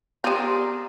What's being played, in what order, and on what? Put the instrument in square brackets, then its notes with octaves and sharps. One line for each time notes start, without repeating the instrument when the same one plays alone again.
[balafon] B3 G4 [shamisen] C4 F4 [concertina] G#4 A#4 D5